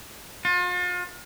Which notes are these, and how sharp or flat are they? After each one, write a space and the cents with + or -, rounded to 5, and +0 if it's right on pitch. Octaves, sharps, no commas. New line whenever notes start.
F4 +40